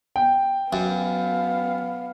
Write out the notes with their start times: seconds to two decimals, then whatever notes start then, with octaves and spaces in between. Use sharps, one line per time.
0.16 G5
0.73 F#2 B3 F5